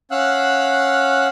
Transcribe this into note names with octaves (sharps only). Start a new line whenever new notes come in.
C#4 F5 F#5 E6 F#6